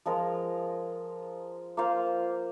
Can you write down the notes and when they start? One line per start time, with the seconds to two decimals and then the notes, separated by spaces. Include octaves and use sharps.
0.06 F3 G#3 F4 A#4
1.77 A#3 F4 C5 F5